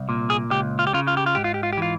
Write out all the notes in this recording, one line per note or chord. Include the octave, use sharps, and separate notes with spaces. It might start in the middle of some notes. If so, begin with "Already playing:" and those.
Already playing: C2
A#2
G#4
C#2 G4
F4
G4
C#3 F4
F4
G4
F4
G#2 G4
F4
G4
F4
G4
E3 F4